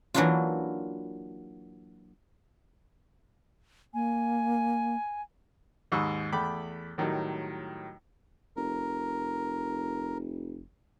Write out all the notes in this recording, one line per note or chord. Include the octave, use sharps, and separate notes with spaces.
E3 F#3 A#3 D4 E4 F4
A#3 G#5
D#2 G#2 D#5 B5 C#6 E6
E2 A3 G5 B5 D6
A2 D#3 F#3 G3
F1 A#4